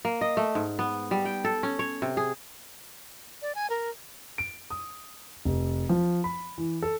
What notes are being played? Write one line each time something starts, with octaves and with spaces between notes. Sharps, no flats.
A#3
D#5
A3
G#2
B3
G3
G5
A4
C#4
C#5
C3
G#4
D5
G#5
A#4
D7
D#6
F1
F3
B5
E3
A4